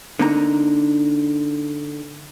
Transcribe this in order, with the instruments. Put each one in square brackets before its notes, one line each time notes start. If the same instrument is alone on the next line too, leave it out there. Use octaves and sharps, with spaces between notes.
[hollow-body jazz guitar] D3 A#3 D#4 A#5